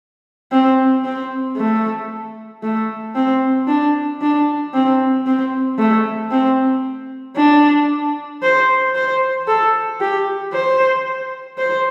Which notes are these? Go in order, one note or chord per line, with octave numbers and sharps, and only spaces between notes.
C4
C4
A3
A3
C4
D4
D4
C4
C4
A3
C4
D4
C5
C5
A4
G4
C5
C5